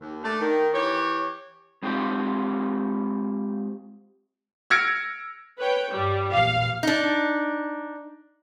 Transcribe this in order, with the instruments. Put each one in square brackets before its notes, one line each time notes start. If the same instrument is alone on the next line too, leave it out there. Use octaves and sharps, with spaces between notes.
[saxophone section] D#2
A3 D4
D#3
E3 G4 C#5
[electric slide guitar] G#3 C4 F4 G4 C5
[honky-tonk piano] E6 F6 G#6 A#6 C#7 D7
[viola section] B4 C#5 G5
[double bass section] G2 [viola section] G3
[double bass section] A#1 E2 A#2 [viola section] F5
[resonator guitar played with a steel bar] D4 D#4